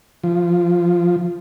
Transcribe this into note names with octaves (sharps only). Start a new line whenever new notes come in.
F3